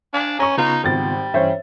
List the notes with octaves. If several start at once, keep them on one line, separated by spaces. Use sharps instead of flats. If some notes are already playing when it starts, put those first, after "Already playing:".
D4 F5 G#5
C#4 A#5 C#6
C#3 B3 D#4 F4
G#1 G3 A6
G2 E3 C#4 C5 C#5 E5